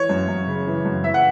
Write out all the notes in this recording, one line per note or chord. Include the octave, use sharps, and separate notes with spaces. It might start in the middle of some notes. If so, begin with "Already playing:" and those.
Already playing: E3 C#5
F#2
F#2
C#3
E3
F#2
E3 E5
F#5